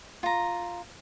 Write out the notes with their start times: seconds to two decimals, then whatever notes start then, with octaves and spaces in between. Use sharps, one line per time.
0.23 F4 A#5